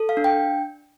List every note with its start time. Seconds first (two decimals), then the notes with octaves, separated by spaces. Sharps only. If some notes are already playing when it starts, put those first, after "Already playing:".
Already playing: A4
0.09 F5
0.17 D4
0.24 G5